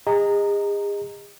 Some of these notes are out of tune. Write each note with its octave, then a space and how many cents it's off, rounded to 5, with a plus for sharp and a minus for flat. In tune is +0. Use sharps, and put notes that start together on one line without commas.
G#4 -40 D#5 +0 A#5 -15